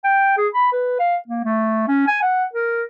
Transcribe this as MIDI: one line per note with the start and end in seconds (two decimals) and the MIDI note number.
0.04 0.37 79
0.37 0.48 68
0.54 0.68 83
0.72 0.98 71
0.99 1.17 77
1.28 1.44 58
1.45 1.85 57
1.88 2.04 61
2.07 2.18 80
2.22 2.45 78
2.53 2.83 70